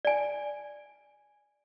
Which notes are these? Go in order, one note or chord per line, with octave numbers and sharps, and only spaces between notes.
D5 G#5